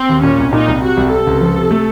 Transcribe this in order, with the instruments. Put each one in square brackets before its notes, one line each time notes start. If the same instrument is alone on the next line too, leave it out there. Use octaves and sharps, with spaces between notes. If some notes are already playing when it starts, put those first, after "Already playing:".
Already playing: [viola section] C4
[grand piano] D#2
[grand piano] A#2 [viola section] C#4
[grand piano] C2
[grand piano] A#2 [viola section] D#4
[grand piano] C2
[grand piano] C3 [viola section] F#4
[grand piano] C2
[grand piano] C3 [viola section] A4
[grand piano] C#2
F3
C3
A3